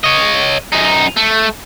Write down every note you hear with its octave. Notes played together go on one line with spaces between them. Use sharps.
C#5 D#5
F#2 D#4
A3